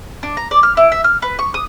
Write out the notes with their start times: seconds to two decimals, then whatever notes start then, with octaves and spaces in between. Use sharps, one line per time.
0.23 D4
0.37 A#5
0.51 D5
0.63 F6
0.77 E4
0.92 E5
1.04 F6
1.22 B4
1.39 C#6
1.54 D#6